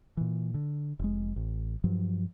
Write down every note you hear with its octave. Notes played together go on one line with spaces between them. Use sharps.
A#2 E3
D3
F1 G#3
A1
G2 F3 F#3